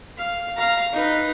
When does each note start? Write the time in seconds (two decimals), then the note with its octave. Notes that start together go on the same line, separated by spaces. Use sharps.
0.17 F5
0.57 F5 A#5
0.93 D#4 B4